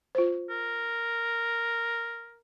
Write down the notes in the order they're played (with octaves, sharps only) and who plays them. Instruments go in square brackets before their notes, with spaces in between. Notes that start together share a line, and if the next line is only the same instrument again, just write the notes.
[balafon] F4 C5
[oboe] A#4